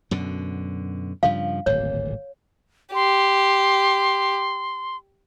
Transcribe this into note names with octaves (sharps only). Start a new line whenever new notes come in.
F#2 B2 D3
G2 C#3 F3 F5
D1 G#1 A#2 C#5
G4 C6